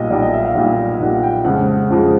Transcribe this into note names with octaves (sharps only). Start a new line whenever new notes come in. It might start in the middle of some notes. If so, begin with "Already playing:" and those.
Already playing: B1 A#2 G3 D#5
B1 A#2 G3 D5
D#5
E5
F5
B1 A#2 G3
B1 A#2 G3 F#5
F#5
G5
F2 C#3 F3 G#3 F#5
F2 C#3 F3 G#3